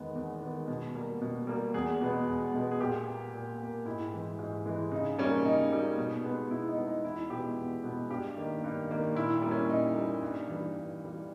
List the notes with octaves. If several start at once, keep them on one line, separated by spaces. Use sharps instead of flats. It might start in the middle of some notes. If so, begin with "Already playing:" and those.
Already playing: E2 D#3 G#3 B3
E2
D#3 G#3 B3
B2
G3 A#3
B2
G3 A#3
E2 G#4
B2 G#3 B3
E2
B2 G#3 B3
G#4
A#2 G4
A#3
A#2
A#3
G#2 E4
E3 G#3
G#2
E3 G#3
C#3 D#4
G3 A#3 C#4
C#3 D#4
G3 A#3
B2
G#3 B3
B2 E4
D#4
G#3 B3
D#4
E2 E4
B2 G#3 B3 G4
E2
B2 G#3 B3
G2 G4
D#3 A#3
G2
D#3 A#3
A#2 E4
G3 A#3
C#4
A#2 D#4
G3 A#3
G2
E3 G3
G2
E3 G3